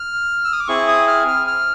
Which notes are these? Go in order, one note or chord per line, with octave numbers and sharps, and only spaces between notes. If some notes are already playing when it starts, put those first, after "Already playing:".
Already playing: F6
E6
D#6
D6
C4 E4 G#4 C#6
D#6
F6
F6
F6